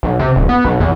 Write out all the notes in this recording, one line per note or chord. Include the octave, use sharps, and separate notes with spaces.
B1
C3
D1
B3
B1
E2